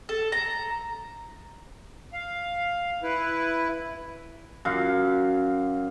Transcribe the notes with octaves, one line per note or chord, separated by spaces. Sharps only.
A4
A#5
F5
E4 B4
F#2 F5